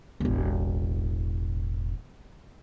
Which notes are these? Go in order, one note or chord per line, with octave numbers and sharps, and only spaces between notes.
E1 A1